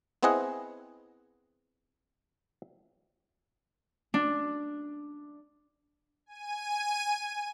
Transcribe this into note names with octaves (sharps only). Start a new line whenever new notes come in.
B3 C4 E4 G#4 D#5 F#5
D4
G#5 D#7